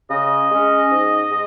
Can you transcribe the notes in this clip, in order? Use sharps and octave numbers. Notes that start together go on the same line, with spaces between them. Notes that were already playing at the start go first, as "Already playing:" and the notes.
C#3 D#5
G#3 C#4
G#2
G#3